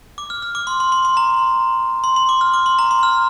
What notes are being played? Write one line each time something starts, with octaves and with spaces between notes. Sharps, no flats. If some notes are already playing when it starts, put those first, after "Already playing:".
D6
F6
F6
D6
C6
C6
C6
C6
A#5
C6
C6
D6
F6
D6
C6
A#5
C6
F6